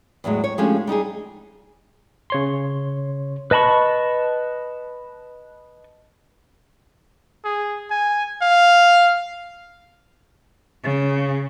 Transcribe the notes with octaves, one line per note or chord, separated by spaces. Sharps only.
E2 A2 F#3 G#3
C#5
F3 G#3 A3 C#4 D4 G4
G3 D#4 G4 G#4
C#3 C#5 C6
B4 D#5 A5 B5 C#6
G#4
G#5
F5
C#3